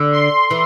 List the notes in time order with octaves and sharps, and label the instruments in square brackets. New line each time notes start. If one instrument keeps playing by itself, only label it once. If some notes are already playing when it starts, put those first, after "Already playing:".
Already playing: [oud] D3
[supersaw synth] C6
[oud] E3